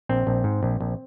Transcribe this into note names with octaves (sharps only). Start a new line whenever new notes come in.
A#1 C4
A#1
G#2
A#1
A#1